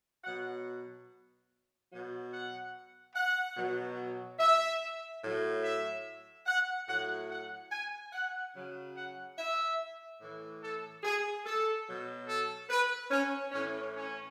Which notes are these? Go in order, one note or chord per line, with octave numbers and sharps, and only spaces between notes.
B2 F#3 F#5
B2 F#3
F#5
F#5
B2 F#3
E5
A2 F#3
E5
F#5
A2 F#3 F#5
F#5
G#5
F#5
C#3 F#3
F#5
E5
A2 E3
A4
G#4
A4
B2 F#3
A4
B4
C#4
A2 E3 C#4
C#4